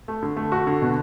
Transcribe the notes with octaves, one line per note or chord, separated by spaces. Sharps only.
A3
D3
A3
F#4
D3
B2